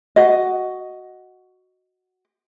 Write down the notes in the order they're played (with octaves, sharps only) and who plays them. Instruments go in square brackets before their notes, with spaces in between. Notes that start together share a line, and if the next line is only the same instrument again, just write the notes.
[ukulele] F#4 D#5